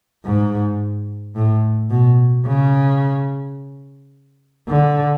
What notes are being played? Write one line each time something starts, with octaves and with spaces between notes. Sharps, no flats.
G#2
A2
B2
C#3
D3